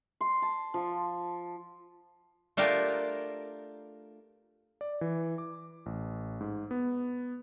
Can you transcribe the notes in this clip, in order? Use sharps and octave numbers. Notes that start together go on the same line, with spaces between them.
C6
A5
F3
A3 D4 F4 G4 A#4
D5
E3
D6
A1
G#2
B3